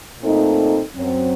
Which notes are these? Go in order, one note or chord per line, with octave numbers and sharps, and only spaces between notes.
A#2 A3 C4 D#4 A4
F#2 F#3 C4